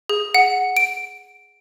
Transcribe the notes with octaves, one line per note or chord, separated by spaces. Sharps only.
G#4
F#5
D7